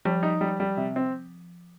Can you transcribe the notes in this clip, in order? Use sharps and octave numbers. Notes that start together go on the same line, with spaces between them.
F3 G3
D#4
G3
G3
C3
C4